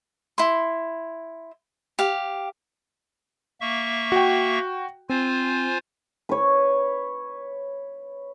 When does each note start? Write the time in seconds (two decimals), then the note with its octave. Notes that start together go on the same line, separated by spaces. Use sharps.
0.38 E4 C6
1.99 G4 F5
3.61 A#3 E5 C#6
4.12 F#4 G5
5.09 C4 F4 C5 G#5
6.29 B4 C#5